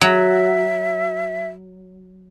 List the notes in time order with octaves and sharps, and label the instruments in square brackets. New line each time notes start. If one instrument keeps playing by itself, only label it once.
[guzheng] F#3 [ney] E5